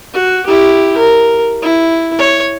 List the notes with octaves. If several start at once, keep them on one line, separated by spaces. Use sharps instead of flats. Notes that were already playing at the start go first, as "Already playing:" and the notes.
F#4
E4 G4
A#4
E4
C#5